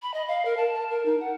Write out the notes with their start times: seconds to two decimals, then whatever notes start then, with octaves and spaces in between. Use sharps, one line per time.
0.02 B5
0.14 D#5
0.28 F5
0.45 A#4
0.57 A5
0.74 A5
0.90 A#4
1.05 D#4
1.20 F#5